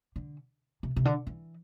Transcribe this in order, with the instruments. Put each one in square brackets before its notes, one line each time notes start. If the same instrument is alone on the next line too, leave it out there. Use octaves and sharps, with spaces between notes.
[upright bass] D3
C3
C3
D3
E3